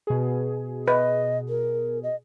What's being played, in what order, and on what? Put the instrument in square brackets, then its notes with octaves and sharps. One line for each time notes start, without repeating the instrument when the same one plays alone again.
[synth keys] B2 G#4
[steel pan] B4 [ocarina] D#5
[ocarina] A#4
D#5